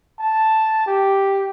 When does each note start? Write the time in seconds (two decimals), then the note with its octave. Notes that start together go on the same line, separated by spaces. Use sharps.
0.19 A5
0.86 G4